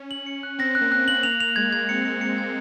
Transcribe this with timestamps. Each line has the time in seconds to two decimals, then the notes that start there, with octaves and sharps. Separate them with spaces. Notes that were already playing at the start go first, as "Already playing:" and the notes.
Already playing: C#4
0.11 F#7
0.26 C#7
0.43 F#6
0.59 C4 A#6
0.75 F#6
0.81 A#3
0.92 F#6
1.03 A#3
1.08 F#7
1.23 A#3 F7
1.40 F7
1.56 G#3 G#6
1.72 G#6
1.89 C4 C#7
2.05 C#7
2.21 C#7
2.38 G#6